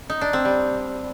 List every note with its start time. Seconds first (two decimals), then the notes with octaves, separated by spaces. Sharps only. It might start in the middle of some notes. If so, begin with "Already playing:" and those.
0.10 D#4
0.21 D4
0.33 C4
0.45 G3